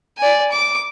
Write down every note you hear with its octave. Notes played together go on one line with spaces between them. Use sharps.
D5 G#5
D6